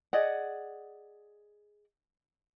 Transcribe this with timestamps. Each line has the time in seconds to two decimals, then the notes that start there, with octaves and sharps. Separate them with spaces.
0.13 G#4 D5 D#5 F#5